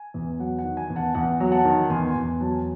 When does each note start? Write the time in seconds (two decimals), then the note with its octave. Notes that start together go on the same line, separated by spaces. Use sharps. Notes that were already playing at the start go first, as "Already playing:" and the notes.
Already playing: G#5
0.14 E2
0.39 F#3 F#5
0.59 F#5
0.64 D#3
0.77 G#5
0.90 E2
0.96 F#5 A5
1.15 E2 F#5
1.40 F#3
1.52 F#5 A5
1.65 D#3
1.90 E2 G#5 C6
2.08 G#5 C6
2.15 E2
2.40 F#3 A5
2.46 G#5